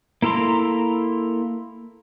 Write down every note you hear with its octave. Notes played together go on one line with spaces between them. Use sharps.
A#3 E4 A4 A#5 C6